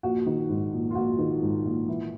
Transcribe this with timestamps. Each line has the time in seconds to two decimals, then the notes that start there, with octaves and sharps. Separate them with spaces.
0.03 A#1 F#4
0.26 D#3
0.49 G#2
0.73 A#1
0.90 F4
0.95 A#1 F#4
1.19 D#3
1.42 G#2
1.65 A#1
1.88 E3